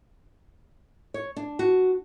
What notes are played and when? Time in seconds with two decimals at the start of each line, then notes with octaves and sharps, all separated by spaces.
1.14 C#5
1.36 D4
1.59 F#4